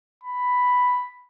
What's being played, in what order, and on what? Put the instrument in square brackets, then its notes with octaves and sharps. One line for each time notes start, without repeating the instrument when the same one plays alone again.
[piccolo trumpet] B5